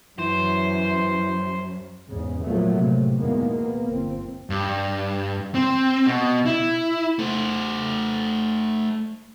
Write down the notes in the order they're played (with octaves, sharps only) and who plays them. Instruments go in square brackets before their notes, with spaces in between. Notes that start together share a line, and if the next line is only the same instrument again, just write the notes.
[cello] F#2 [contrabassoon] E3 [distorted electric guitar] C5
[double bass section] E2 G#2 C#3
A#2 F3 F#3 A3 A#3
A2 C3
E2 B2 D#3 G#3 A#3 B3
A#3 B3
G1 C4
[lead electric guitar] G2
C4
B2
E4
A3 C5